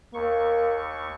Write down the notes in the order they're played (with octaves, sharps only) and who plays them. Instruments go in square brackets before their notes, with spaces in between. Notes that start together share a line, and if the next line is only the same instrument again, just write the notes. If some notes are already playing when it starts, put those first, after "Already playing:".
[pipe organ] D#2 C#6 [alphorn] A#3